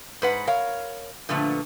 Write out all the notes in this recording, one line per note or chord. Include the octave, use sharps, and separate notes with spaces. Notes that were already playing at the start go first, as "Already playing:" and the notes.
G#2 B4 F#5
A#4 C#5 F5
A#2 D3 F3 A3 B3